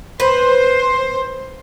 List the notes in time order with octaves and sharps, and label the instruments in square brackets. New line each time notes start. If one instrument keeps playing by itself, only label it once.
[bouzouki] B4 [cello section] C5